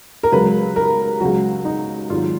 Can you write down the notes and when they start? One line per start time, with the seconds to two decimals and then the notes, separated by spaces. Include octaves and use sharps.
0.23 A#4
0.32 C#2 C#3 F#3 B4
0.76 A#4
1.21 C#2 C#3 F#3 F#4
1.65 D#4
2.10 G#1 G#2 D#3 F#3 F4